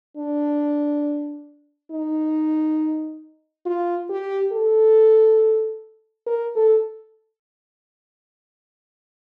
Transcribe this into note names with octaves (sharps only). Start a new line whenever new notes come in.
D4
D#4
F4
G4
A4
A#4
A4